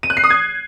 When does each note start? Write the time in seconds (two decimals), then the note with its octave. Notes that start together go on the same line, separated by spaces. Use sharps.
0.03 D#7
0.10 F#6
0.17 C7
0.24 D#6
0.30 G#6